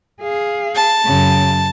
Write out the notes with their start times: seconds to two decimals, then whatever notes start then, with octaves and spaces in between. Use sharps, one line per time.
0.22 G#4 F5
0.75 A5
1.05 F#2 C#3